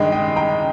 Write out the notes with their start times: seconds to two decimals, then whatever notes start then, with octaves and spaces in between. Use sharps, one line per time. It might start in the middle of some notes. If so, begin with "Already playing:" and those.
Already playing: G2 D#3 G#3 D#5 G5
0.12 D#5 G5
0.36 G5 A#5